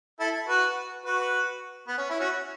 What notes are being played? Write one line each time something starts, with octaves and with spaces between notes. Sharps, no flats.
E4 A4
F#4 B4
F#4 B4
B3
C#4
E4
C#4 F#4